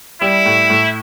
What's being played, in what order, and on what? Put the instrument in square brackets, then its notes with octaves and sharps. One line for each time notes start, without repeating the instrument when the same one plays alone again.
[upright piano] G3 [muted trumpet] E4
[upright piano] A2
A2